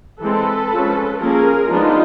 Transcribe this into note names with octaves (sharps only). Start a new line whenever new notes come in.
E3 G#3 C4 A4 B4
F3 G#3 C#4
F3 A#3 C#4 G#4 A#4
F3 G#3 B3 D4 D#4 F4